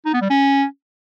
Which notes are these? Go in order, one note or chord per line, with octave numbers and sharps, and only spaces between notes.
D#4
B3
G3
C#4